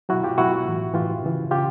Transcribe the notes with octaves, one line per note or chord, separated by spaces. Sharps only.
B2 F#3 E4 F#4
F4 G4
B2 F#3 E4 F#4
A2 E3
A2 E3 F4 G4
C#3 E3
C#3 F4 G4